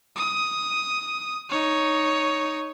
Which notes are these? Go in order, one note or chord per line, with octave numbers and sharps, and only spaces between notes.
D#6
D#4 C#5